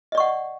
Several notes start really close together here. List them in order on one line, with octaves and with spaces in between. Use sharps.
D#5 D5 C#6 F#5